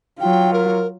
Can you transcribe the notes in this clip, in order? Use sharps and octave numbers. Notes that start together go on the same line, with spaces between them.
F#3 F4 G5
A#4